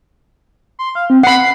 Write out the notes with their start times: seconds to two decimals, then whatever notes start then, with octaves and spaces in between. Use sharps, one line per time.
0.79 C6
0.95 F5
1.10 C4
1.23 F#5 B5 C7